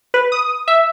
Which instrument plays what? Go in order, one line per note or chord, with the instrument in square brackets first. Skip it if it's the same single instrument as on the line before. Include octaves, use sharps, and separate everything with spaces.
[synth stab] B4
D#6
E5